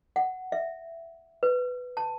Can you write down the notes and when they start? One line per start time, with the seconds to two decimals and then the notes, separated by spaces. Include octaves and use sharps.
0.16 F#5
0.52 E5
1.43 B4
1.97 A5